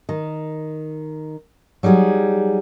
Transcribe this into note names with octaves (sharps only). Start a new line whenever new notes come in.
D#3
F#3 G3 D#4 G#4 F#5